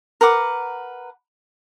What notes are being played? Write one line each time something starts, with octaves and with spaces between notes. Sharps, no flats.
A#4 B4 F#5 D6